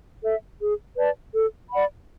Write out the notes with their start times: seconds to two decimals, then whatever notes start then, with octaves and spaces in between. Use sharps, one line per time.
0.22 A4 E5
0.60 G#4
0.97 B4 D5 A5
1.33 A4
1.71 D5 F#5 B5